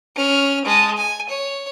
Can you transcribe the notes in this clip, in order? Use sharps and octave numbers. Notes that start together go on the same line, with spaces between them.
C#4 F6
G#3 A5
G#5
C#5